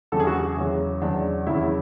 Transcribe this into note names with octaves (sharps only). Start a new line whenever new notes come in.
E2 C#3 F#3 A4
G#4
F#4
G#4
E2 C#3 F#3
E2 C#3 F#3 D4
E2 C#3 F#3 E4